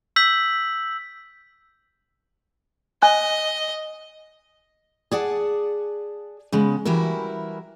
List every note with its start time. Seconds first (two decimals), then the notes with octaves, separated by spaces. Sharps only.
0.16 E6 G6 B6 F#7
3.02 D#5 G#5 F#6
5.11 G#4 D5 F#5 A5
6.52 C#3 G#3 B3
6.85 E3 G3 E4 F#4 A#4